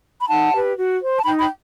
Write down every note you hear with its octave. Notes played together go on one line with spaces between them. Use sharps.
B5
D#4 F#5 A5
G4 B4
F#4
C5
A5
D#4 G5 B5
G5 B5